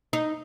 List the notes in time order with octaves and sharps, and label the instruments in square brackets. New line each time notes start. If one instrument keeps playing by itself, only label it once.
[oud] D#4